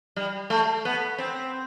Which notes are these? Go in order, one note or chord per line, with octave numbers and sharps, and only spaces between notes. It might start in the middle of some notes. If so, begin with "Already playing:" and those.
G3
A3
B3
C4